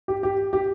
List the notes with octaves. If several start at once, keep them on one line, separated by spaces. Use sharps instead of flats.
G4
G4
G4